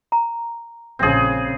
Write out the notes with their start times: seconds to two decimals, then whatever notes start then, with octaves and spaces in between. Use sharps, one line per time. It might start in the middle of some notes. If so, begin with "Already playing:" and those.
0.12 A#5
0.99 A#1 C#3 C4 G#4